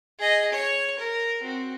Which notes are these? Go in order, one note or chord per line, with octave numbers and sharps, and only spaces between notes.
G#4 D#5
C#5
A#4
C4 F#4